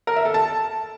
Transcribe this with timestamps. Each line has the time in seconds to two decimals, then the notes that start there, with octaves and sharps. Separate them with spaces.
0.07 A#4
0.16 E5
0.25 A4
0.34 A5